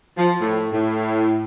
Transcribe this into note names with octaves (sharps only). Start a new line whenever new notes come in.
F3
A2
A2